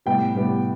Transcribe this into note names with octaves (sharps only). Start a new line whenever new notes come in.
A2 G3 B3 G5
A2 G3 B3